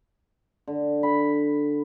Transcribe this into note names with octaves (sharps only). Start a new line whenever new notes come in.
D3
B5